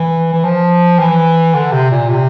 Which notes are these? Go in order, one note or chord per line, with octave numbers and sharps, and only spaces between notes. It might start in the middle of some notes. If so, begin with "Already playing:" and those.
Already playing: E3
E3
F3
E3
D3
C3
A#2
C3